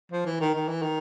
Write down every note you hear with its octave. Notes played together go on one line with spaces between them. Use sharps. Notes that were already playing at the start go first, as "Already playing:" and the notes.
F3
E3
D#3
D#3
E3
D#3